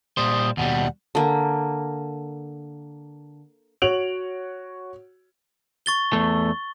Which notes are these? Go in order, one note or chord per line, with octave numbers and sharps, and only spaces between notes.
A#2 G3 C5 D#6
D#2 B2 G3 F#5
D3 A#3
F#4 C#5 D7 F7 F#7
C#6 A6 G7
E2 A3